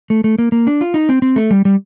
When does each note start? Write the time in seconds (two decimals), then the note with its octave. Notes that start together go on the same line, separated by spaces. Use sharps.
0.10 A3
0.24 A3
0.38 A#3
0.52 A#3
0.67 D4
0.81 F4
0.94 D#4
1.09 C4
1.22 C4
1.36 A3
1.51 G3
1.65 G3